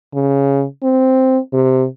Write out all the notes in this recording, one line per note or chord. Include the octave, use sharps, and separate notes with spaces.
C#3
C4
C3